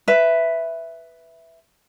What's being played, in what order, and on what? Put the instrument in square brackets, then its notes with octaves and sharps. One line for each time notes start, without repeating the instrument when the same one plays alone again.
[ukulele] B4 E5